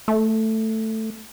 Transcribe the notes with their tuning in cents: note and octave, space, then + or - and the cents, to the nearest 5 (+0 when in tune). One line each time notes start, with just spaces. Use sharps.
A3 +5